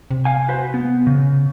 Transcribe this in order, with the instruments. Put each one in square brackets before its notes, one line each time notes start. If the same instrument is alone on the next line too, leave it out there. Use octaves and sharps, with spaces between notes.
[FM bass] C3
[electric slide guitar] F5 G#5
F#4 B4 C5
B3
C#3